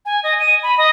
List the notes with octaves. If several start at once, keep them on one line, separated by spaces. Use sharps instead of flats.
G#5
D#5
D#7
B5
D#5